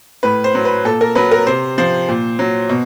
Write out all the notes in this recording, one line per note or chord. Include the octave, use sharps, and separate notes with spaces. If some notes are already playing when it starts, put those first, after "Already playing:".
A2 B4
C5
F#3
B4
A#2 A4
A#4
F#3 B4
A#4
C3 C5
F3 C5
A#2
F#3
B2